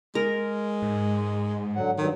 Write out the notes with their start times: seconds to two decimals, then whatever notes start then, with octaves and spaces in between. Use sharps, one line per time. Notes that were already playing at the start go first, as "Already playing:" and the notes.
0.15 G#3 A#4
0.82 G#2
1.75 D3 F#3 F#5
1.98 G2 D#3 F#3